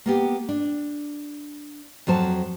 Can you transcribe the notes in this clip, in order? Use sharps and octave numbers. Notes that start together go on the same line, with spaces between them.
A#3 B3 G4
D4
F2 F#3 C5 A5